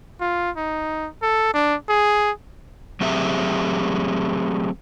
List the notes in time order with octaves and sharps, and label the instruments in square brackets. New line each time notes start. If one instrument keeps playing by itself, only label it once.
[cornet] F4
D#4
A4
D4
G#4
[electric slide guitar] F#3 A3 C4 G4 G#4 E5